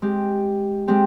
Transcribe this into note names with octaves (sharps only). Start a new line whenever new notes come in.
G#3 C4 G4
G#3 C4 G4